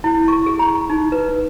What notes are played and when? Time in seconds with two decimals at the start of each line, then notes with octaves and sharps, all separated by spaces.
0.04 E4
0.28 C#6
0.46 G#4
0.59 A#5
0.90 D#4
1.12 B4